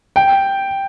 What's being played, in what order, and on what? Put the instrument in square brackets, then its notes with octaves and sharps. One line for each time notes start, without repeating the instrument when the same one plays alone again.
[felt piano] G5